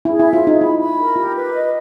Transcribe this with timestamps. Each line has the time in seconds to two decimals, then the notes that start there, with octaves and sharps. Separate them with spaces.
0.05 E4 G#4
0.19 E4
0.23 E5
0.33 F4
0.42 D#4 G#4
0.61 E4 B5
0.79 B5
0.97 A#4
1.16 F4 G4
1.35 B4
1.53 D#5